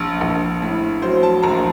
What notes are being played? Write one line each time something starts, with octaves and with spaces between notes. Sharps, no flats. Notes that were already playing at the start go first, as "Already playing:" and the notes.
Already playing: A#1
A#1
A2
F#3 C5
A5
A#1 A#5